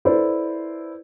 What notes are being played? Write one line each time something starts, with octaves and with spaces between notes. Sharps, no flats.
E4 A4 B4 C5 D5